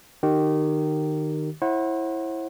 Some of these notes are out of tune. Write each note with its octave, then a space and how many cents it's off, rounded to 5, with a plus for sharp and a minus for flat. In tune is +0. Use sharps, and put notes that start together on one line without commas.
D#3 -20 G4 -30
E4 +0 C5 +45 F#5 +0